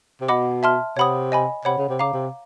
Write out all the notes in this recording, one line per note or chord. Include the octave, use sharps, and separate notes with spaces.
C3
B2 D#5 F#5 B5 D6
E5 A5 C6 F6
C3 C#5 F#5 B5 D#6
D#5 G#5 B5
C3 C#5 F#5 B5
C#3
C3
C#3 F5 A#5 D6
C3